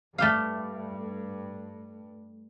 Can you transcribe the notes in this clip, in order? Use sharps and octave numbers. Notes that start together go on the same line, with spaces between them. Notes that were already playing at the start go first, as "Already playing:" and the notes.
G2 A3 G4 F5